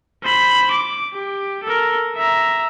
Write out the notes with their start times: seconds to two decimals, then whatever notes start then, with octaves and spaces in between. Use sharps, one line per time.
0.23 C5 B5
0.71 D6
1.13 G4
1.63 A4 A#4
2.15 E5 A#5